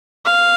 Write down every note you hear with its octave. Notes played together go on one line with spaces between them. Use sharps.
F5